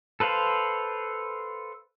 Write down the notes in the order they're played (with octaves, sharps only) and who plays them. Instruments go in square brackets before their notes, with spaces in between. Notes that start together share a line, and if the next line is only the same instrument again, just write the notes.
[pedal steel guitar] A4 B4 C5 F5